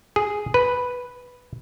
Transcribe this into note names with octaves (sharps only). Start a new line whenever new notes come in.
G#4
B4